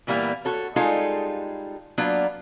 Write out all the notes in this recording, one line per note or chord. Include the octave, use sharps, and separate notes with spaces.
A#2 E3 G3 A#3 B3
F#4 A4 C#5
G3 G#3 D#4 F4 G#4 A4
F#3 A#3 B3 D4 F4